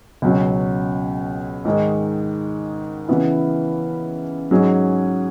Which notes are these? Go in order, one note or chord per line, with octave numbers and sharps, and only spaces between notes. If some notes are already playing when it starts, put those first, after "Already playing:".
C#2 B2 F#3 C#4
G#2 D#3 G#3
C#3 E3 B3 E4
G#2 F#3 C#4 G#4